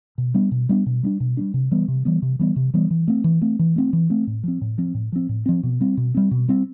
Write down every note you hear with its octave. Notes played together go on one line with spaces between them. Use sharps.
B2
G3 B3 D4
B2
G3 B3 D4
B2
G3 B3 D4
B2
G3 B3 D4
C3
E3 G3 B3
C3
E3 G3 B3
C3
E3 G3 B3
C3
E3 G3 B3
E3
A3 C4
E3
A3 C4
E3
A3 C4
E3
A3 C4
A2
F3 C4
A2
F3 C4
A2
F3 C4
A2
F3 C4
B2
G3 C4
B2
G3 C4
B2
G3 C4